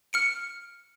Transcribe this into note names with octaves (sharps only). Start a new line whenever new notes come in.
F6 C#7 D7